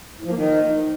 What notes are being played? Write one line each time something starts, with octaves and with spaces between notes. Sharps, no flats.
A2
F3
A#3
D#3